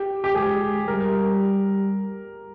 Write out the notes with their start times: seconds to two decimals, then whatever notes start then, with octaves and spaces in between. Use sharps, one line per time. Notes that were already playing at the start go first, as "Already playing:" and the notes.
Already playing: G4
0.24 G4
0.35 G#3 G#4
0.88 G3 A#4